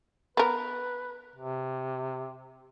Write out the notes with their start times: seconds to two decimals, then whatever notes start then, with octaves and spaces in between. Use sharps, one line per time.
0.37 B3 A#4 B4
1.36 C3